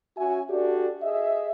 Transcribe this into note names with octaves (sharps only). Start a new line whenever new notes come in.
C#4 F#4 E5 G#5
D4 F#4 G4 A4 D5
G#4 D#5 E5